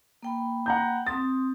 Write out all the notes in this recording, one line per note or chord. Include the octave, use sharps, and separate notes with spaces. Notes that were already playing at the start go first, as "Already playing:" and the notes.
A#3 G5 B5
F#5 A#5 G6
C4 C6 D#6 A6